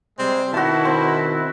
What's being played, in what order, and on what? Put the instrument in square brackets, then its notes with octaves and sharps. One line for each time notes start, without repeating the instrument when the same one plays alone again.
[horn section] C3 G3 G#3 [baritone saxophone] C4
[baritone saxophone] B2 [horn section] D#3 E4 [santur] F#4 A5
[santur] C4